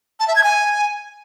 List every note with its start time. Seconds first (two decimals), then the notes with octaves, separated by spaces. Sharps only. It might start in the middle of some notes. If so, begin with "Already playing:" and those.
0.20 A5
0.28 E5
0.36 G#6
0.44 G#5